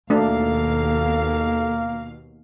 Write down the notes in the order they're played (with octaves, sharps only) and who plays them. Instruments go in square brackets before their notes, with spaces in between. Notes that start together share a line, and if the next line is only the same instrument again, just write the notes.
[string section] D#2 B2 F5 [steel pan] A3 D4 F#4 [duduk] A#3 [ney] A4